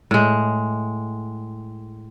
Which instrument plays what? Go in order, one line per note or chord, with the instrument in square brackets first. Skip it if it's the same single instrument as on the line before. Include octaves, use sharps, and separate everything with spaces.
[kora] A2 G#3